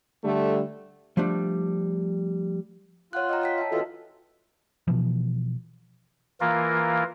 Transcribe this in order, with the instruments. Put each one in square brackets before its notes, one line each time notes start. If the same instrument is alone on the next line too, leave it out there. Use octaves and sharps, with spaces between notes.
[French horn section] D3 G3 A3
[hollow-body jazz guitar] F3 G3 A3 D4
[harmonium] F4 [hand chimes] C#5 F#5 F#6
[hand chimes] D#5 G5 A#5
C#5 G5 B6
E5 A5
[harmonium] E3 F4 A4 [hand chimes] F#4 D#5 E5
[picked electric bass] B2 E3 F3
[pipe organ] E3 A#3 F4 A#4